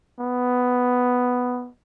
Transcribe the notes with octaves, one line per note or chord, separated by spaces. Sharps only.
B3